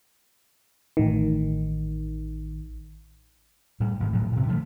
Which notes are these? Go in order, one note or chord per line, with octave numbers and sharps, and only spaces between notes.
A1 D#3
A2 G3
A1 G#2 D#3
A1 A2 F3 F#3
A2 C3
D3 D#3 F3 A3